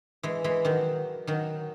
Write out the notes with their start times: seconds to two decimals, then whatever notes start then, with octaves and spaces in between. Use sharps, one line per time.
0.23 E3 G#3
0.44 E3 G#3
0.65 D#3 F#3
1.27 D#3 F#3